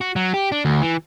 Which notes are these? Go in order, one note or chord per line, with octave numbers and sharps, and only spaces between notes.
F#4
F#3
G4
D4
D2
E3